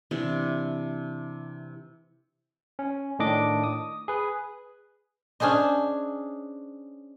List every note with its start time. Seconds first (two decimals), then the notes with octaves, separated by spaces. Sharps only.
0.11 C3 E3 D4
2.79 C#4
3.19 A2 D#3 D4 D#5 D6
3.64 D#6
4.08 G#4 B4
5.40 C#4 D4 G#4 C5 D#5